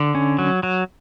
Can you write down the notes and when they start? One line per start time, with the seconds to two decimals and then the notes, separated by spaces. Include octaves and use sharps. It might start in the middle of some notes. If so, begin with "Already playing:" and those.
Already playing: D3
0.15 C#4
0.39 F#3
0.63 F#3